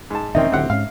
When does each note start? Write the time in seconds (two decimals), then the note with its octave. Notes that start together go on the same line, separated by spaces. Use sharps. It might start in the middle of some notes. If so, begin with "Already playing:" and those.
0.10 G#2 A5
0.35 E1 D#3 C4 C#4 D#4 E5
0.52 D1 D2 A2 C4 G4 F#5
0.70 G#2 C#4 F5